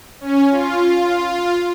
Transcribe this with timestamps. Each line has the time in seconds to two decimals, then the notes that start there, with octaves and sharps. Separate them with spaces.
0.21 C#4
0.51 F4